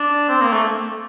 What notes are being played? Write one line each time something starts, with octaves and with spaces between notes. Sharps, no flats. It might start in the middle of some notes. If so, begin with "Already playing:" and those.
Already playing: D4
C4
A#3
A3